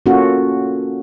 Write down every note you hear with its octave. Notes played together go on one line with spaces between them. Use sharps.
A#3 C#4 F4 F#4 A4